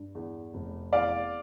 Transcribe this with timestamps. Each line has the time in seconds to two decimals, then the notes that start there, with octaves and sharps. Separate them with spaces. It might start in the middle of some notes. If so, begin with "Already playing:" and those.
Already playing: G2
0.15 E2
0.54 F1
0.93 E2 D5 F5